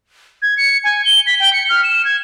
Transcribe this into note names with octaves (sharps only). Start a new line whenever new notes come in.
G#6
C#7
G#5
G7
B6
G5
C#7
F6
E7
G#6